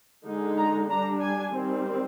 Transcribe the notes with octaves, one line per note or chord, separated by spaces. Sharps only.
D3 G#3 D#4
A#5
G3 D4 A#5
G#5
D#3 G3 C4